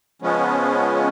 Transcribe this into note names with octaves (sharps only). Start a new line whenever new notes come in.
C#3 F3 G#3 B3 C#4